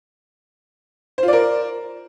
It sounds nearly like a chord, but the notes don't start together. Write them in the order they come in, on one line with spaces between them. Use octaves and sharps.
C5 F4 D5 A#4